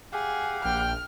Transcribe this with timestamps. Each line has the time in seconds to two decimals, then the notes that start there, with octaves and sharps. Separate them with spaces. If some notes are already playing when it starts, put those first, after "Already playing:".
0.12 G4 G#4 F5 F#5
0.64 A#1 G5 F6